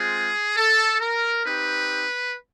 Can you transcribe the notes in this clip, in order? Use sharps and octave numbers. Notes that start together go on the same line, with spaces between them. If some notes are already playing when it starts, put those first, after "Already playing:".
Already playing: G#3 C4 F4 G#4
A4
A#4
C4 D#4 G4 B4